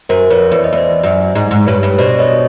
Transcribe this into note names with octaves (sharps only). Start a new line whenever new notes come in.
F#2 A#4 C5
F2 B4 C#5
E2 D5
D#5
E2 C5 D5
F#2
G#2
G#2
G2 B4 C#5
G2
B2 C5 D5
C#5 D#5